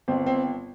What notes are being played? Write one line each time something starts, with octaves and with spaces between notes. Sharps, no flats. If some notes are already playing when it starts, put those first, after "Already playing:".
G1 C4
C4